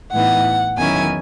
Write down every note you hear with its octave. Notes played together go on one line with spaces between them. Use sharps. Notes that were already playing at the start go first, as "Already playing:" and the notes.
A2 E3 B3 D#4 F#5
E2 D#3 F#3 C#4 E4 G#5